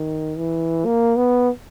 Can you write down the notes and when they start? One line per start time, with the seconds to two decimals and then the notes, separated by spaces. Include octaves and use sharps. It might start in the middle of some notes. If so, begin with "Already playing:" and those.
Already playing: D#3
0.38 E3
0.85 A#3
1.16 B3